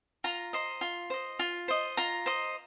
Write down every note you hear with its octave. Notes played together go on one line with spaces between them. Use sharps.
F4 A#5
C5 D#5
F4
C5 D#5
F4
C5 D#5
F4 A#5
C5 D#5